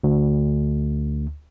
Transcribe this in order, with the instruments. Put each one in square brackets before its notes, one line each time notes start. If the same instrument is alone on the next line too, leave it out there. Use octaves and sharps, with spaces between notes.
[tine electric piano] D2